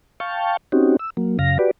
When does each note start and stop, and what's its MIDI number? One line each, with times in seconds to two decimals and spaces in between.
0.20 0.57 77
0.20 0.57 79
0.20 0.57 81
0.20 0.57 85
0.72 0.97 60
0.72 0.97 61
0.72 0.97 63
0.72 0.97 66
0.72 0.97 67
0.99 1.10 88
1.17 1.38 54
1.17 1.38 58
1.39 1.58 42
1.39 1.58 49
1.39 1.58 77
1.39 1.58 94
1.59 1.71 66
1.59 1.71 67
1.59 1.71 71
1.59 1.71 74